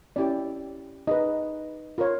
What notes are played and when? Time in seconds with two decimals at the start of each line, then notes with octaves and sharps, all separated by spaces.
0.16 C#4 E4 G4 D5
1.07 D#4 G#4 B4 D#5
1.98 F4 A#4 C#5